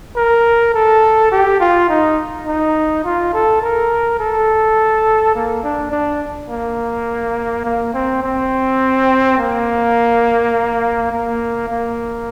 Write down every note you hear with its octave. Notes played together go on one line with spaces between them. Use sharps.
A#4
A4
G4
F4
D#4
D#4
F4
A4
A#4
A4
A#3
D4
D4
A#3
A#3
C4
C4
A#3
A#3
A#3